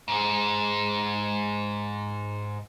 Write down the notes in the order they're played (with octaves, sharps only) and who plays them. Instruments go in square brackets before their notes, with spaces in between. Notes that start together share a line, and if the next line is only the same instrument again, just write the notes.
[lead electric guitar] G#2 G#3